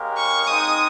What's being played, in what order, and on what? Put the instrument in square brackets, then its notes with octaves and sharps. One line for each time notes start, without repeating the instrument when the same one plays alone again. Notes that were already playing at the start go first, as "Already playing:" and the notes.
Already playing: [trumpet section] G#3 C#4 G4 A#4 F5
[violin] C#6
[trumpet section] G#3 C4 D#4 [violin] D#6